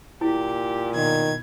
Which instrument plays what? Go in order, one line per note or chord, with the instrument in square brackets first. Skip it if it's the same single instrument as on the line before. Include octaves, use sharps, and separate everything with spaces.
[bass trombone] A#2 [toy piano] E4 [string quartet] G4
[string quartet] B2 G#6 [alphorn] D#3